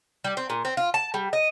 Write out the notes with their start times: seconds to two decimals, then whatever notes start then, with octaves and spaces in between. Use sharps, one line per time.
0.24 G3
0.37 C4
0.50 A#2
0.65 C4
0.77 F4
0.94 A5
1.14 G3
1.33 D#5